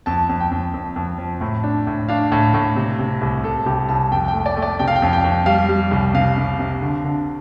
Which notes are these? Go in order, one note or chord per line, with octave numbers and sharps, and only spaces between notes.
F2 A5
F2
G5
F2
F2
F2
F3
A2
D4
A2
D4 F5
A2
A2
C3
C3
C2
C2 A4
C2 G4
C2 A5
F2 G5
G5
A3
D5
A3
D5
C3 G5
F5
G5
F2
G5
F2
G3 F5
G3
C2
C3 F5
C3
C3
D3
D3